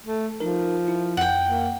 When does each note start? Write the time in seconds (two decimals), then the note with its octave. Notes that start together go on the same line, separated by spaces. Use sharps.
0.03 A3
0.40 F3 D#4 A#4
0.88 E4
1.17 F2 F#5 G5
1.47 A#3